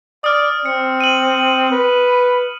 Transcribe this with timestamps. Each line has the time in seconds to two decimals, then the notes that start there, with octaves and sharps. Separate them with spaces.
0.24 D5 D#6 F6
0.66 C4 C#7
1.01 D#7 F#7
1.71 B4